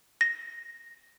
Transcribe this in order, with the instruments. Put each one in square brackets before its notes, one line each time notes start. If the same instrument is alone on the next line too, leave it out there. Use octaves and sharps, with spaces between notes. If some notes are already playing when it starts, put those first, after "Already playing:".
[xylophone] A#6